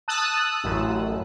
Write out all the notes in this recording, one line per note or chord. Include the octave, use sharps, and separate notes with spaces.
A5 D#6 E6 F#6
A1 F#2